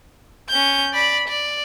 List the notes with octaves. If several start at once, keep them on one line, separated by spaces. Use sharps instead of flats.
C#4 G6
D5 B5
D5